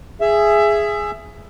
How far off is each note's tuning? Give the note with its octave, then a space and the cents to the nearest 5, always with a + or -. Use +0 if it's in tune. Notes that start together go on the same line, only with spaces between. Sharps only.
G#4 +0 E5 +20